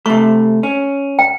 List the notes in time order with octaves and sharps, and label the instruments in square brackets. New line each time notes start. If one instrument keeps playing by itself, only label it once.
[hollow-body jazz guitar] C3 A3 [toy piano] C#6
[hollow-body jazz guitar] C#4
[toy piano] G5